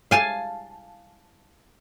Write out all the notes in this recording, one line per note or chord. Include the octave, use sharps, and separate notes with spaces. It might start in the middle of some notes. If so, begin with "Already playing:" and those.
F5 G#5 A5